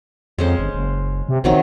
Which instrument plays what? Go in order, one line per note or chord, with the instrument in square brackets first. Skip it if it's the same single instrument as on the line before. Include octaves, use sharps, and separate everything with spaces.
[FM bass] F2 [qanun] G#3 C#4 C5
[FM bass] G1
F#1
C3
[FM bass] A#1 [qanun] C3 D#3 F#3